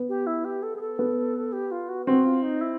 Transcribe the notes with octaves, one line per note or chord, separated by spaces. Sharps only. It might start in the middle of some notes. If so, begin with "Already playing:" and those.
Already playing: B3
G4
E4
G4
A4
G#4
A4
B3
G4
F4
F#4
C4 F#4
F4
D#4
E4